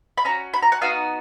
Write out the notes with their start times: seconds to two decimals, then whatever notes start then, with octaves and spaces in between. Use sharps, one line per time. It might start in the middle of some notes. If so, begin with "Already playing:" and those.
0.18 B5
0.25 C#4 F#4 A#5
0.54 B5
0.62 A#5
0.72 F#5
0.81 B3 D#4 F#4 F5